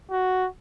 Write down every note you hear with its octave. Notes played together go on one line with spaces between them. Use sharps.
F#4